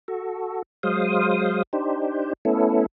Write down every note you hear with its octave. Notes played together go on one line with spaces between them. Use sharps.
F#4 A4
F#3 G#3 C5 F5 D#6
D4 D#4 G4 C5
A3 B3 C#4 E4 A4